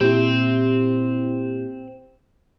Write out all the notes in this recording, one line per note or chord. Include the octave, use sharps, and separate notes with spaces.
A#2 C4 E4 G4